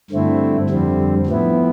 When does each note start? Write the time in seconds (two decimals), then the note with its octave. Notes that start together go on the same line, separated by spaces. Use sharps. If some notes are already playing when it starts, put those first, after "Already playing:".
0.10 G2 D3 A3 C4 E4
0.69 F2 D3 G3 C4
1.27 A2 F3 B3 E4